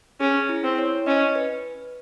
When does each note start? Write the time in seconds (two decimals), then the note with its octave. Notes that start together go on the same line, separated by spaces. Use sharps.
0.20 C#4 G#4
0.49 E4
0.64 C4
0.78 C#5
1.06 C#4 D#5
1.36 B4